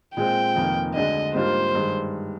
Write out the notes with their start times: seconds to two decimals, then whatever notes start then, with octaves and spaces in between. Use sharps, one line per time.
0.16 A#2 G#3 C4 G5
0.55 F1 F2 D#3 A#3
0.95 D2 D3 G#3 D4 D#5
1.34 G#2 G3 A#3 D4 F4 C5
1.75 G2 D#3 G#3